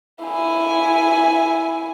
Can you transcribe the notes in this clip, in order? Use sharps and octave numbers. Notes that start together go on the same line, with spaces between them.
E4 G#5